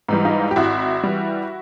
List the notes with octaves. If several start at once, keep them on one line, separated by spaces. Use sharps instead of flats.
G#2 E3 G3
D#4 F4
G4
G#1 E4 F#4
E3 G3